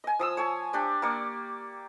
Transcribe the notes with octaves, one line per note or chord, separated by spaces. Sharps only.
D#5 G#5
F3 D#6 E6
C#5 G#5 A5
D4 G4 D5
A#3 D5 C#6